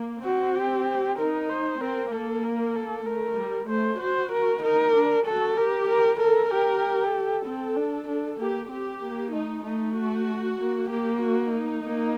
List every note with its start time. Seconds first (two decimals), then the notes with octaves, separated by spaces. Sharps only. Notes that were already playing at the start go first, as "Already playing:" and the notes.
Already playing: A#3
0.24 C4 F#4
0.55 G4
1.18 D#4 A#4
1.49 C5
1.81 C4 A#4
2.12 A#3 A4
2.44 A#4
2.75 A4
3.06 A3 A#4
3.37 G3
3.69 A3 C5
4.00 F#4 C5
4.32 A#4
4.63 D#4 A#4
4.94 D4
5.25 F#4 A4
5.57 G4 A#4
5.88 A#4
6.19 A4 A#4
6.51 G4 A#4
7.14 A4
7.45 C4
7.76 D4
8.08 D4
8.39 A#3 G4
8.70 C4 G4
9.02 A#3
9.32 A3 D#4
9.64 A3 D#4
9.96 F#4
10.59 A#3
10.90 A#3 G4
11.21 F#4
11.52 D#4
11.84 A#3